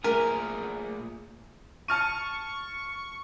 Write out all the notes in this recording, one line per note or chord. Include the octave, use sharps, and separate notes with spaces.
A#2 A3 G#4 A#4 E5 G#5
A5 C#6 F6 D#7